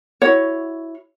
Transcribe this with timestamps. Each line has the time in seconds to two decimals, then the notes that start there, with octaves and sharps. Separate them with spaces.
0.22 E4 F#4 C#5